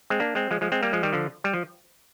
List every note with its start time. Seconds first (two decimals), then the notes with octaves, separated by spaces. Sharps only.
0.10 G#3 C4
0.20 A#3 D4
0.35 G#3 C4
0.51 F3 G#3
0.61 F3 G#3
0.72 G#3 C4
0.83 G3 A#3
0.93 F3 G#3
1.03 D#3 G3
1.13 D3 F3
1.44 G3
1.54 F3